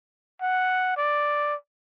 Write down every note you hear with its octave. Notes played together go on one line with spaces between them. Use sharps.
F#5
D5